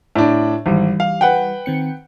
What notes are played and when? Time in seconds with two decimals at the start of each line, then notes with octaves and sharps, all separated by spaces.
0.15 A2 D4
0.66 G#1 E3 G3
1.00 F5
1.21 B4 F#5 G5
1.66 D#3 C4 C#7